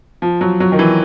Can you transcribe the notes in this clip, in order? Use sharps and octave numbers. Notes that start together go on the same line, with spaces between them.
F3
F#3
F#3
D#3
E3